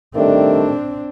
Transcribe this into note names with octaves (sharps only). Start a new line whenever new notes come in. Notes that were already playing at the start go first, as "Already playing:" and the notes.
D#3 G3 A3 C4 D4